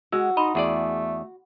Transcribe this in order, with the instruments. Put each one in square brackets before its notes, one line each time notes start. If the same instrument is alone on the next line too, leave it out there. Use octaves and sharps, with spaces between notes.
[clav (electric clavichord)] G#3 [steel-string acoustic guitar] F#4 [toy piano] E6
[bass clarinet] D#4 [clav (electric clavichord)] D#5 [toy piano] B5 C6
[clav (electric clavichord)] E2 G#4 D5 [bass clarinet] A3